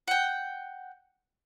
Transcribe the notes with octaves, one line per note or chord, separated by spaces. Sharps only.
F#5 G5